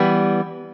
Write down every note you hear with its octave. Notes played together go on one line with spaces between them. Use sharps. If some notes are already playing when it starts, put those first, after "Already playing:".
Already playing: E3 G3 B3